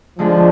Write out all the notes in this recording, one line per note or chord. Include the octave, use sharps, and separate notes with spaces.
D3 F3 G#3 D4